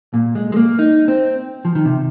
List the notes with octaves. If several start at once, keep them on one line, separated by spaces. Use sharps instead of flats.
A#2
G#3
G#3
A#3
D#4
C4
F3
D#3
C3